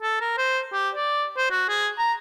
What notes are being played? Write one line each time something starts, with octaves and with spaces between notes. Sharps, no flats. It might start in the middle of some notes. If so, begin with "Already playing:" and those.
A4
A#4
C5
G4
D5
C5
F#4
G#4
A#5